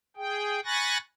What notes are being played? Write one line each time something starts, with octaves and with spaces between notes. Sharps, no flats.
G#4 G5
G#5 B5 C#6 F#6 A6 A#6